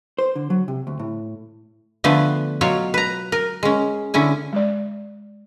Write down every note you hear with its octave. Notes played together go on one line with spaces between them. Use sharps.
C5
D3
F#3
C3
D2
A2
D3 F3 A3 B3 B4 G#5
B2 F#3 F4 C#5
B4 A#5
A#4
G#3 C#4
D3 C#4 E4 G#5
G#3 D5